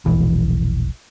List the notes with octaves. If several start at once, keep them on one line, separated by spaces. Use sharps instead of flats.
E1 A#1 E3